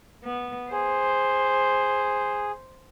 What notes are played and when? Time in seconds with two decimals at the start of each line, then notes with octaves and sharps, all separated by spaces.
0.25 B3
0.72 G#4 C5